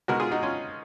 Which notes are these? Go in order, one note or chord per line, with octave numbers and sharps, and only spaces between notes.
B2 G#3 F#4 A#4
F4 G#4
D#4 F#4
C#4 F4